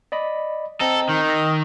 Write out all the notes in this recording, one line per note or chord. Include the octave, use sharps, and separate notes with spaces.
D5 D#5 B5
C4 A4 D#5 A#5
D#3
E6 A#6